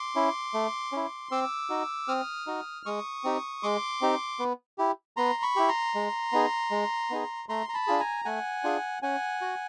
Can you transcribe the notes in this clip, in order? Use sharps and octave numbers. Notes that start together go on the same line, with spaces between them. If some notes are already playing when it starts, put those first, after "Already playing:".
Already playing: C6 D6
C#4 E4
A3
C#4 E4
C4 D6 E6
D#4 F#4
C4 D#6 F6
D#4 F#4
G#3 C#6 D#6
C4 D#4 G4
G#3 C6 D6
C4 D#4 G4
B3
E4 G4
B3 A#5 C6
B5 C#6
E4 G4
A#5 C6
G#3
B3 D#4 G#4
G#3
B3 D#4 G#4
A3 A#5 C6
A#5
A5 B5
D4 F4 G#4
G#5 A#5
A3 F#5 G#5
D4 F4 G#4
C#4 F#5 G#5
F#4